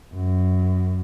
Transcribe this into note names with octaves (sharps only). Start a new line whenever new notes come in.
F#2